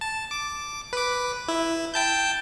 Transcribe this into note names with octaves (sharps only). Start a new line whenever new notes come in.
A5
D6
B4 D6
E4
G5 A5 G6